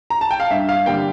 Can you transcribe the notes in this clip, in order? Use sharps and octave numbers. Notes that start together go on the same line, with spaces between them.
A#5
A5
G5
F5
G2 E5
F5
D3 G3 A#3 G5